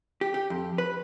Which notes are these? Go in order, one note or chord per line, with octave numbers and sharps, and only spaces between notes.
G4
G4
F2
B4